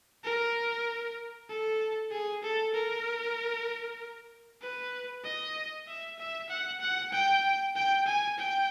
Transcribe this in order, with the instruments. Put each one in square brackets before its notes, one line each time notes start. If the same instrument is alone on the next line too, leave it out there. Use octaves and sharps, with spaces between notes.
[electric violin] A#4
A4
G#4
A4
A#4
B4
D#5
E5
E5
F#5
F#5
G5
G5
G#5
G5